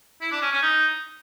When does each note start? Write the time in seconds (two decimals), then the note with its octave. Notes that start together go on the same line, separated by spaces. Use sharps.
0.21 E4
0.32 D4
0.42 C#4
0.52 C#4
0.62 D#4